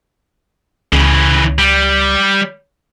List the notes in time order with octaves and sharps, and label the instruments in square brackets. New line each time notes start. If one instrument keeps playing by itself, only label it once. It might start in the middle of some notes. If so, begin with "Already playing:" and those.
[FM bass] C#2 [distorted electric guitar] C#3 E3
[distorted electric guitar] G3